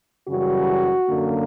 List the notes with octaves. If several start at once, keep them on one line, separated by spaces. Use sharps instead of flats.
F#2 C#3 E3 G3 F#4
F#2 D3 A#3